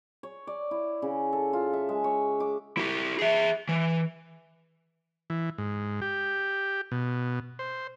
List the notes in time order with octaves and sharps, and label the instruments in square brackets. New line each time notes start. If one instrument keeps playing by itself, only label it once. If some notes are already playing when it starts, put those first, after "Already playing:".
[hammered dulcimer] C#5
D5
E4
C#3
A4
F4
E5
G#3
C#5
D6
[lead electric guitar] E4 G4
G#4 E5
E3
[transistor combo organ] E3
G#2
G4
B2
C5